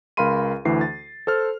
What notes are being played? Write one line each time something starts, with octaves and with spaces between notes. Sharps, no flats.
C#2 A#4 F5 B5 C6 D#7
D2 E3 C7
A6
A4 C5 F6